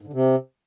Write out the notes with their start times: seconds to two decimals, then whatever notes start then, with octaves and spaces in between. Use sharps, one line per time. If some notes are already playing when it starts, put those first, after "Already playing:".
0.02 G#2
0.07 D3
0.13 C3